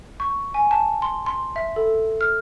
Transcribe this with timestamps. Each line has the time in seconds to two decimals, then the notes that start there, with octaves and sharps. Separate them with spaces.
0.20 C#6
0.54 G#5
0.71 A5
1.02 C6
1.26 C6
1.56 E5
1.76 A4
2.21 F6